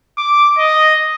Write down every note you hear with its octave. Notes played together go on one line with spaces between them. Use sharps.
D6
D#5